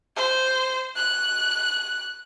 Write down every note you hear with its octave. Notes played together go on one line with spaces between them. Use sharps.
C5
F#6